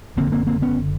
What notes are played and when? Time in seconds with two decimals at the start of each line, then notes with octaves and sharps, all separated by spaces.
0.17 F#1 F2 D3 A#3 C4
0.32 A#3 C4
0.47 A#3 C4
0.62 B3 C#4